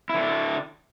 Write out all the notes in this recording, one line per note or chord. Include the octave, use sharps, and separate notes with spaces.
D3 D4 E4